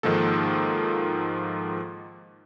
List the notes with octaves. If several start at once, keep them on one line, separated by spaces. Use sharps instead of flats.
G#2 D#3 F3 A#3 A4